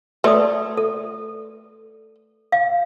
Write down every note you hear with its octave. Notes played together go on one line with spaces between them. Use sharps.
A3 B4 D5 D#6
A4
F5